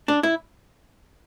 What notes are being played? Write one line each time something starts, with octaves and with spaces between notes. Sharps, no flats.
D4
E4